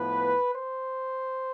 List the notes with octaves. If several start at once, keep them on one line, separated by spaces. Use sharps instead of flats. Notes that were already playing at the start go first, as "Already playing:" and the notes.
Already playing: A2 F3 B3 B4
C5